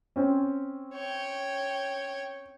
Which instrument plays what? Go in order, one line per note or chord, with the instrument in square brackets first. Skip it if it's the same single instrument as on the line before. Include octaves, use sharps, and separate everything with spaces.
[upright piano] C4 C#4
[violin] C#5 G5